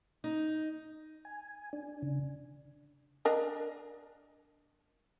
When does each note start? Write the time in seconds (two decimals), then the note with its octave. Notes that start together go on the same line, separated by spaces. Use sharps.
0.24 D#4
1.25 G#5
1.73 D4
2.02 C#3
3.25 D4 A#4 D#5